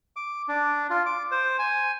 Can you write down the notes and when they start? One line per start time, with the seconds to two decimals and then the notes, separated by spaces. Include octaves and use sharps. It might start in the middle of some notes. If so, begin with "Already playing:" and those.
0.16 D6
0.48 D4
0.90 F4
1.06 D6
1.32 C5
1.59 G#5